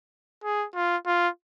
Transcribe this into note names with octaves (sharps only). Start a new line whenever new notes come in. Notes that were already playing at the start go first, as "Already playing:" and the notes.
G#4
F4
F4